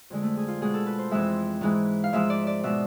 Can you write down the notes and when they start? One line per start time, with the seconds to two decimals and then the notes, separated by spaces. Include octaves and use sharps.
0.10 F2 D3 G#3
0.23 A3
0.37 G#4
0.48 F4
0.61 B2 G#3 G#4
0.74 A4
0.86 B4
0.99 C5
1.11 F2 E3 G#3 E5
1.61 G#2 E3 G#3
2.04 F5
2.13 G#2 F3 G#3 E5
2.30 D5
2.47 D5
2.63 B2 G#3 E5